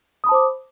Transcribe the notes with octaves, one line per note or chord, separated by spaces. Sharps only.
C5 A5 B5 D6 D#6